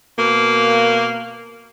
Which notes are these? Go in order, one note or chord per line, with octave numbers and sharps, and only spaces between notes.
B2 A#3